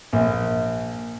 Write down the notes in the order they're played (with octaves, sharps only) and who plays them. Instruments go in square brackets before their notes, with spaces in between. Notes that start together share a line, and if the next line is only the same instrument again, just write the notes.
[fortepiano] A#1